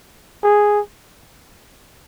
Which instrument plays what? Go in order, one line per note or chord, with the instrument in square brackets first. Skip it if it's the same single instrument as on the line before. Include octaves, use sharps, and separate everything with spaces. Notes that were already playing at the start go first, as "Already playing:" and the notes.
[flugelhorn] G#4